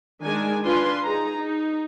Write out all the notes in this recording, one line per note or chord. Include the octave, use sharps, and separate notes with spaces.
D#3 G#3 D4 G#5
D4 F4 B4 G#5 C6
D#4 G#4 A#5
D#4